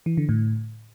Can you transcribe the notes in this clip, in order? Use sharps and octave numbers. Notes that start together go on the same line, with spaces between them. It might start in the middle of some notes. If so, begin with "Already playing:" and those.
E3
D3
A2